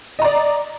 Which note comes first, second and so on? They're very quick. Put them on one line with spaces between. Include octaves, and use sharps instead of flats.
D#5 A#5 D5